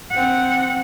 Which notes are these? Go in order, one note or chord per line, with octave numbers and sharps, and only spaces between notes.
C4 F#5